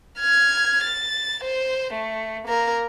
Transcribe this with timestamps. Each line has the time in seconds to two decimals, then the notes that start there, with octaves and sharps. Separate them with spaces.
0.19 F6 G#6
0.84 A6
1.45 C5
1.94 A3
2.48 A#3 A#4